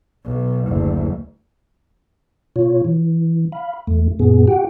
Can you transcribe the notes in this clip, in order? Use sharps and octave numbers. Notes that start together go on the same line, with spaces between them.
B1
F#1 D2
B2 F4 C#5
E3
F5 B5
E2 A3
F#2 A#2 B3 G#4
F#4 G4 F#5 G5